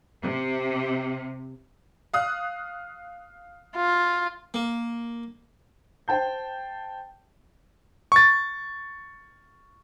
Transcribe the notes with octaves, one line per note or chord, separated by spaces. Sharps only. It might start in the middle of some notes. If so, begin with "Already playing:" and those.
C3
F5 D#6 F#6
F4
A#3
C5 G5 A5 G6
C#6 A6